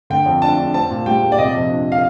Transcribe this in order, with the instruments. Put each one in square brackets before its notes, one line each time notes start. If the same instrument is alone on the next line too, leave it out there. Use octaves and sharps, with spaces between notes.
[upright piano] D3 G5
F2
D4 A5
D4
C4 A5
A#2
G3 G5
A#2
D5
C3 D#5
F2
D4
F5